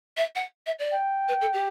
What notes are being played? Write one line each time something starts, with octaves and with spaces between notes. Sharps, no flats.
E5
F#5
E5
D5
G5
B4
A4
G4